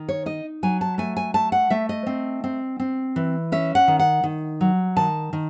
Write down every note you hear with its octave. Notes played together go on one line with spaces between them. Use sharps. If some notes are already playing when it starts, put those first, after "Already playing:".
Already playing: D#3
C#5
D#4 D#5
F#3 G#5
A5
A3 G#5
G#5
A3 A5
F#5
A3 E5
D#5
C4
C4
C4
E3
C#4 E5
F#5
D#3
F#5
D#3
F#3
D#3 A5
D#3